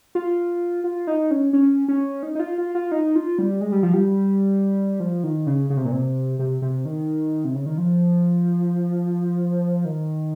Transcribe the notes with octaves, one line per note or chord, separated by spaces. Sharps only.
F4
F4
D#4
C#4
C#4
C#4
D#4
D#4
F4
F4
F4
D#4
F4
G3
G#3
G3
F3
G3
F3
D#3
C#3
C#3
C3
A#2
C3
C3
C3
D#3
C3
C#3
D#3
F3
D#3